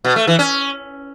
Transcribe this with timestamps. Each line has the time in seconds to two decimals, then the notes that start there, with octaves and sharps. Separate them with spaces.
0.04 B2
0.16 A3
0.27 E3
0.39 C#4